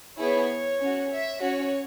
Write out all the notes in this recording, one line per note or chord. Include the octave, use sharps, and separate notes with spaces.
B3 E4 G#4 C#5
C#4 F#4
E5
C#4 F#4 C#5